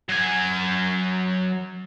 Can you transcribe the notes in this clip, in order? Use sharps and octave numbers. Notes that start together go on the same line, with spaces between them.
F#3 G#5